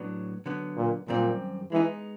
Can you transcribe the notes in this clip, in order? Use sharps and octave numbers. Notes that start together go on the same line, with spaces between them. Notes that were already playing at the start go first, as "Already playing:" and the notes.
Already playing: A2 F#3 B3 D4
D3 F#3 B3
A#2
F#2 A#2 D#3 G3 C4
E3 G#3 B3 D#4